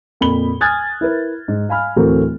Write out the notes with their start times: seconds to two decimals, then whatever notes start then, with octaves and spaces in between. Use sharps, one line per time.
0.21 F2 A#2 B5 G7
0.61 G#5 D#6 F6 F#6 G#6 A6
1.01 E4 A#4 B4
1.48 G#2
1.69 F5 G#5 B5 F6
1.96 D1 E3 A3 C4 F#4 A#4